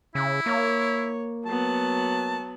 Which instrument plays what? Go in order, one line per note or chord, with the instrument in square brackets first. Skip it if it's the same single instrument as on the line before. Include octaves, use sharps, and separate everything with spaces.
[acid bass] C#3 [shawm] E4
[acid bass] A#3 [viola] C#5
[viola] F#3 B3 [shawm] A5